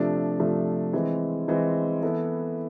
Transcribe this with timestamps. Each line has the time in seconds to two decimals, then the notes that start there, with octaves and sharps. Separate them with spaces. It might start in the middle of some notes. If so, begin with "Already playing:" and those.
Already playing: C3 F3 A3 D4
0.39 C3 F3 A3 D4
0.93 E3 G#3 C4
1.48 E3 G#3 C4
2.02 E3 B3 E4 A4